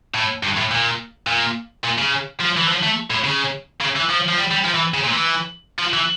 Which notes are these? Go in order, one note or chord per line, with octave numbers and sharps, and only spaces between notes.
A2
G2
A2
A#2
A#2
A#2
C#3
F3
E3
F3
A3
A2
C#3
C#3
E3
F3
F3
G3
G3
F3
E3
C#3
A#2
E3
F3
E3